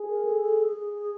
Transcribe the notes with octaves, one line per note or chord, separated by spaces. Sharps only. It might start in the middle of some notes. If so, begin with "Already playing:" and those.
Already playing: G#4
A#4
A4
A4
G#4